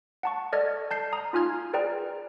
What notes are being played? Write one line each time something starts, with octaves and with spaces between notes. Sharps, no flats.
F#5 A5 C#6
A4 D5 D#5 F6 G#6 A#6
A5 G6 C7
A#5 D#6
D#4 F4 G#5 F6 G#6
G#4 A#4 B4 D5 G5 A#5